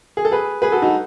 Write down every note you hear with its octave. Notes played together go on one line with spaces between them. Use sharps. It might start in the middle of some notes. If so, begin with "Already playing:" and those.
G#4
A4
G#4 B4
G#4 B4
F#4 A4
D#4 F#4